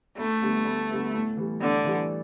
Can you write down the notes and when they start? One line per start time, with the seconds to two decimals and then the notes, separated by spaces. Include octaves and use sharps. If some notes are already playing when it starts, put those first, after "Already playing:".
0.18 D2 A3
0.42 D3 G3 B3
0.65 D2
0.90 D3 G3 B3
1.13 A2
1.37 E3 G3
1.61 A2 D3
1.85 E3 G3